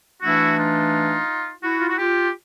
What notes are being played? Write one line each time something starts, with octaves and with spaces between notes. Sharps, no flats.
E3 A3 D4 E4 F#4
D#4 F4
E4 F#4
F4
F#4
F4 G4